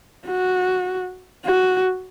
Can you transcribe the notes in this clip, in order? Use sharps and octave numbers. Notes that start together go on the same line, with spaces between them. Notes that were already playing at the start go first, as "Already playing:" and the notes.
F#4
F#4